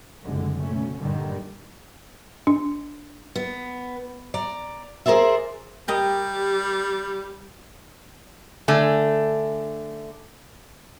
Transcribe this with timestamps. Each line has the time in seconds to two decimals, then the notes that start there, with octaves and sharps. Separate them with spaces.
0.24 F#1 C2 A2 D3 G#3
0.61 D2 B2 A3 C#4
0.99 G2 A#2 D3 D#3 G3
2.47 D4
3.36 B3
4.34 D5 A#5
5.06 G#4 A#4 C5 D5 E5
5.88 G3 G4 A#4 D#5
8.68 D3 A3 G#5